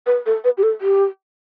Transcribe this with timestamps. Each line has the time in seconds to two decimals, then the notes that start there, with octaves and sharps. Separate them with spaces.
0.06 B4
0.26 A4
0.44 B4
0.58 G4
0.63 A4
0.81 G4